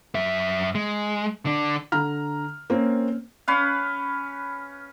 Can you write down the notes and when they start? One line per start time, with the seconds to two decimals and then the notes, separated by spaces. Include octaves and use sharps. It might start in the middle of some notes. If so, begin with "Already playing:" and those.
0.15 F#2 E5
0.75 G#3
1.45 D3 D4
1.92 D3 A#5 F6
2.70 A#3 C4 C#4
3.48 C#4 B4 F5